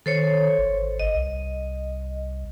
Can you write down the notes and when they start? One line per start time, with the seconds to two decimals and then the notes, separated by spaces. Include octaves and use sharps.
0.06 D#3 A4 C5 C#5
0.59 G#1
0.99 D#5
1.15 C2